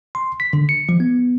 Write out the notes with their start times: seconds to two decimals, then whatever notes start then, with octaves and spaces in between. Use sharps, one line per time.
0.15 C6
0.40 B6
0.53 D3
0.69 C#7
0.89 F3
1.00 B3